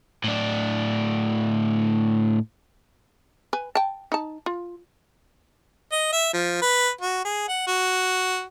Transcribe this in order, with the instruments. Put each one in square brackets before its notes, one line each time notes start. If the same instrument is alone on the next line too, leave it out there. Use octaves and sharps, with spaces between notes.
[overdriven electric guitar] A2 D4
[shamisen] B4 G#5
G5 A5
D#4 A5
F4
[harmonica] D#5
E5
F3
B4
F#4
G#4
F#5
F#4